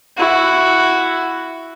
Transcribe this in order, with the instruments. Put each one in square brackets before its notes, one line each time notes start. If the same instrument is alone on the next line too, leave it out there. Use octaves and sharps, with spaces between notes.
[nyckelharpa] E4 F#4